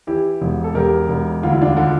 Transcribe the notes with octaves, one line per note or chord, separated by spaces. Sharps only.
E3 E4 G4
E1
A4
E1 G4 A#4
E1
D2 F4
E4
D4 F4
D3